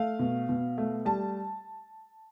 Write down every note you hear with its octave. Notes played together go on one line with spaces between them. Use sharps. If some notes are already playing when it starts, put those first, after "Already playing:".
Already playing: A3 F5
B2
B2
A3
G3 A5